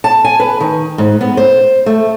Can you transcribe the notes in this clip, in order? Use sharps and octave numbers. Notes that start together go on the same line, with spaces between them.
A5
G#5
B4
D#3
G#2
B3
C5
A3